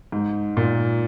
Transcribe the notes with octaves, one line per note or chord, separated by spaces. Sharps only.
G#2
A#2